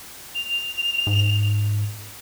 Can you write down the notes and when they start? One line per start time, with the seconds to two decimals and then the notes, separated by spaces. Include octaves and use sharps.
0.35 F7
1.07 G#2